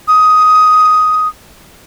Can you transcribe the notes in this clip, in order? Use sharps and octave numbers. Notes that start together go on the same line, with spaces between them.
D#6